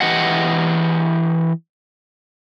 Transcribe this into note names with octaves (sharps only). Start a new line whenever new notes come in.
E3 G4 D#5 F#5